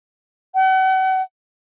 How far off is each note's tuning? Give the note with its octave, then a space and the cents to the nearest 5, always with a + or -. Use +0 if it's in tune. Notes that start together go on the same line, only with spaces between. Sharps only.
F#5 +40